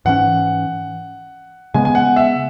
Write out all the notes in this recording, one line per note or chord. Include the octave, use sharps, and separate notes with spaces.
G#2 E3 C#4 F#5
C#3 G#3 B3 G#5
G#5
F#5
E5